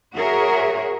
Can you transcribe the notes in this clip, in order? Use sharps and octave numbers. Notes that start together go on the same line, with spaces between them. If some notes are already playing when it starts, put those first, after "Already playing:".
F#4 G#4 A#4 C#5 E5